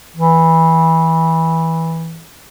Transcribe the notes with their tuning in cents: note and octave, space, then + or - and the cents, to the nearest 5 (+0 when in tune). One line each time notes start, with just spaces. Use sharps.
E3 -15